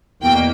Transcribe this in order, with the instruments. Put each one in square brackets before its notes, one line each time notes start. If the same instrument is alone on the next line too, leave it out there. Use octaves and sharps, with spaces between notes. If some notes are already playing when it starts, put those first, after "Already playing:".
[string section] E2 B2 A#3 G5